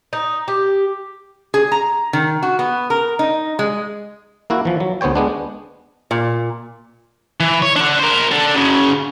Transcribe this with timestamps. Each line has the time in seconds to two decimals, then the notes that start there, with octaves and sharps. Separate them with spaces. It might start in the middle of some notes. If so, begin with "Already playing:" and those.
0.13 D#4
0.48 G4
1.54 G#4
1.72 A#5
2.13 D#3
2.43 F#4
2.59 B3
2.90 A#4
3.19 D#4
3.59 G#3
4.50 A#3 E4 F#4
4.65 E3 F3
4.80 F#3
5.01 D2 B3 C5 C#5 G5
5.15 G#3 B3 D4
6.11 A#2
7.40 E3
7.62 C#5
7.76 D4 F#5
7.99 A#4 C5
8.32 D4 A4
8.55 F#2 C#3